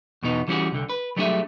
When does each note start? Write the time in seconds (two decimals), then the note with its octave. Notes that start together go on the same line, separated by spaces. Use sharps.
0.23 E2 B2 B3 D#4
0.48 E3 G3 B3 C#4 F#4 G#4
0.72 C2 D3
0.90 B4
1.16 F#3 G3 A3 D4 G#4 E5